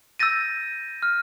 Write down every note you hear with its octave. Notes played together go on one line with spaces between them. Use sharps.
E6 G6 A6 A#6 D#7
F6